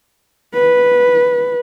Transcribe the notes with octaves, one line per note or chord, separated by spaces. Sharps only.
B4